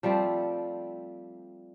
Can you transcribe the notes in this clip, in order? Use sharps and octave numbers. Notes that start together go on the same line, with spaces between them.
F3 G3 A3 C4